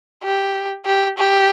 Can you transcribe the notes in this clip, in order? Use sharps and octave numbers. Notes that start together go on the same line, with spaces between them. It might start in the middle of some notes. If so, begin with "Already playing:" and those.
G4
G4
G4